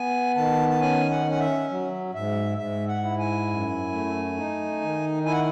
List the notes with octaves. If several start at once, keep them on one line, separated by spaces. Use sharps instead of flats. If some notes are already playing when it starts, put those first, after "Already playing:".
Already playing: B3 G#5
D#3 A5
A5
C#4 G#5
F#5
C#4
F#5
E5
F#3
G#2 E5
G#2 E5
F#5
E4
G#5
F#2
A3
D#4
D#3
E4 G#5
F#5